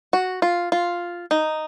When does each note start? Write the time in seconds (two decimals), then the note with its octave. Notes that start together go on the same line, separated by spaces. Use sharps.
0.13 F#4
0.42 F4
0.72 F4
1.31 D#4